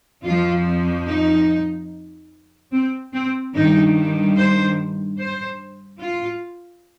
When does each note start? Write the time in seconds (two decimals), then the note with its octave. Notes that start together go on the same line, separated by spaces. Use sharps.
0.25 F2 F3 F4
1.07 D#4
2.72 C4
3.14 C4
3.55 G2 D#3 G3 D#4
4.37 C5
5.19 C5
6.02 F4